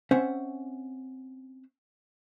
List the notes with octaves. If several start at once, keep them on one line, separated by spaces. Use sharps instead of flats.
C4 C#4 C5 E5 F#5